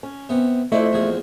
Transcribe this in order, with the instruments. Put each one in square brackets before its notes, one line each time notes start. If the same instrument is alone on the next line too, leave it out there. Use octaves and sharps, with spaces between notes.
[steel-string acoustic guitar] C#4
[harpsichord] C3 B3
[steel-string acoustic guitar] F2 C5 D#5 [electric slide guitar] A3 [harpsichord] E4 D5
[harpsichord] A#1 E2 G#4